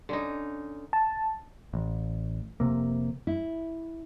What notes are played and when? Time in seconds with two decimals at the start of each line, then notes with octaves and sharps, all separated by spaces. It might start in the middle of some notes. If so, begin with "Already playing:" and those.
0.09 D3 C#4 D#4
0.93 A5
1.74 A1
2.60 F1 D#2 C3 A#3
3.27 E4